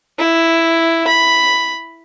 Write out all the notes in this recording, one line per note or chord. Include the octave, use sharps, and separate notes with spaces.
E4
B5